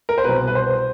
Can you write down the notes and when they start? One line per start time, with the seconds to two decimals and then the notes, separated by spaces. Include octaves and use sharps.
0.09 A#4
0.18 C5
0.24 C2 B2 B4
0.47 B4
0.55 C5